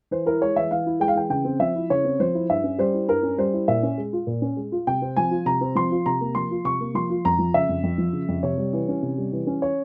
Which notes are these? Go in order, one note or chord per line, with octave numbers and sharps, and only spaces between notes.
E3 C5
E4 A#4
G#3 C#5
E3 E5
E3 F5
E4
G#3 G5
F5
E3 G5
C#3 G5
C4
F3 E5
E4
C#3 C#5
C4
F3 C5
E4
G2 E5
C#4
G3 C5
E4
G2 A#4
C#4
G3 C5
E4
A#2 E5
C#4
G#3
F4
A#2
C#4
G#3
F4
C3 G5
C4
F3 G#5
F4
C3 A#5
C4
F3 C6
F4
C3 A#5
A#3
F3 C6
F4
C3 C#6
A#3
F3 C6
F4
F2 A#5
F3
C#3 E5
F2
F2
F3
C#3
F2
C3 C#5
G3
E3
C#4
C3
G3
E3
C#4
C#5